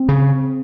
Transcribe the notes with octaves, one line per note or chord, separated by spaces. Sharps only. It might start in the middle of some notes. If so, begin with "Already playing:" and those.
Already playing: C4
C#3